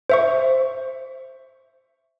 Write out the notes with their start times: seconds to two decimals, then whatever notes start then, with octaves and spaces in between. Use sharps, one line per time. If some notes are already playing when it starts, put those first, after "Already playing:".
0.10 C5 E5 C#6